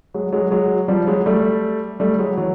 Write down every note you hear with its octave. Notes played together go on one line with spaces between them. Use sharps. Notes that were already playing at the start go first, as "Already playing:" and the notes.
F#3 G#3
F#3 G#3
F#3 G#3
F3 G3
F#3 G#3
G3 A3
G3 A3
F#3 G#3
E3 F#3